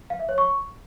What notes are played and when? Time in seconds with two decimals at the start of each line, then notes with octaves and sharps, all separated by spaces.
0.10 F5
0.19 E5
0.29 C#5
0.38 C#6